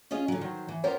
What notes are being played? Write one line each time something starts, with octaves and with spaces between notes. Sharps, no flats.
C#4 F4 G#4 D#5
D3 F#3
D#3 F#3 C5
E3
B3 F4 G4 A#4 C5 C#5